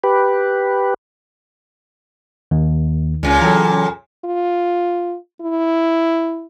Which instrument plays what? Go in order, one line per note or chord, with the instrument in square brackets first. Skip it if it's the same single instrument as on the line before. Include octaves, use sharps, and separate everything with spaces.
[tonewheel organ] G4 B4
[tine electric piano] D#2 [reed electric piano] D#3
[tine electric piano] C#2 [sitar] A#2 C#3
[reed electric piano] E3 F#3 [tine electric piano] A4 G5 A#5
[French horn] F4
E4